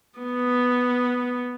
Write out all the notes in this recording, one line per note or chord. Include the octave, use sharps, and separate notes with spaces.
B3